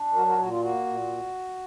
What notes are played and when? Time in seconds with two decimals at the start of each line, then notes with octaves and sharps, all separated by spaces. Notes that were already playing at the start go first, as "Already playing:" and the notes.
Already playing: D4
0.14 F#3 F#4 A#4
0.26 F#4 A#4
0.38 A#2 F#4
0.50 F4
0.62 A#3 F#4
0.86 A#2